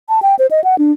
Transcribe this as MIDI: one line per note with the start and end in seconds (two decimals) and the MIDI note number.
0.09 0.20 81
0.22 0.35 79
0.39 0.47 72
0.51 0.63 75
0.64 0.76 78
0.78 0.92 62